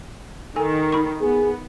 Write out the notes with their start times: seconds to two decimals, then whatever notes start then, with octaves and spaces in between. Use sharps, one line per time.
0.56 D#3 A4 G#5
0.92 D#4 B5 C#6
1.21 B3 G#4